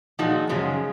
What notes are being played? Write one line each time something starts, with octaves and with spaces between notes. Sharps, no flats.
A#2 F3 G#3 D#4 F#4
F#2 C#3 F3 G#3 C#4